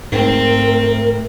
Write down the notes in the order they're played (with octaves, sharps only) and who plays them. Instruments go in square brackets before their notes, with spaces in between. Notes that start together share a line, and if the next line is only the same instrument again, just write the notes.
[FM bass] G#2 [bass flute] A3 [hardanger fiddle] C4 [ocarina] A#4